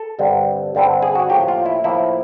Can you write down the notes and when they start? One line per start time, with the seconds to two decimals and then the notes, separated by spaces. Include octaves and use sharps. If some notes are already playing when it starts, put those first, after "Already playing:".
Already playing: A4
0.19 G2 D3 G3 C4
0.75 G2 D3 G3 C4
1.02 G#4
1.15 F#4
1.30 A2 F3 A#3 G4
1.48 F4
1.66 E4
1.84 A2 F3 A#3 E4